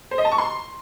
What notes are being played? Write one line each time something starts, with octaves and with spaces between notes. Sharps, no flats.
C5
D#5
A5
C#6
C6